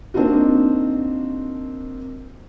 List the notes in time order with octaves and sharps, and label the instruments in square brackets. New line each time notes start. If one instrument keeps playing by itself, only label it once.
[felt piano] A#3 C4 D4 D#4 F4 F#4